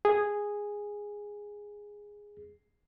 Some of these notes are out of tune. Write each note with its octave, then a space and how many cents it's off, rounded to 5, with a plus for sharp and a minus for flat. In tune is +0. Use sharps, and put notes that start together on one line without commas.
G#4 -5